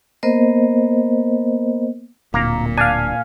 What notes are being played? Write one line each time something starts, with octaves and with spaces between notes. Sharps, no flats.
A#3 B3 A#4 C5 D#5
D1 A#2 A#3 A#5
D4 F5 G#5